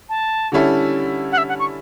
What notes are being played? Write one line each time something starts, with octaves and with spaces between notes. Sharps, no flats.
A5
D3 G3 C#4 E4 A4
F#5
E5
F#5
C#6